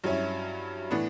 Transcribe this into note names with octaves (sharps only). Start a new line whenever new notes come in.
G2 F#3 C#4 E4
A2 E3 B3 D4